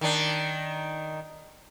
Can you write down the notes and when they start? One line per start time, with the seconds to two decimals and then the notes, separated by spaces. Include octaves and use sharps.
0.01 D#3 D4